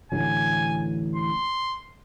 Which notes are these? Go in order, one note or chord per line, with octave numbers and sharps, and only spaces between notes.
A1 D3 F#3 G#5
C6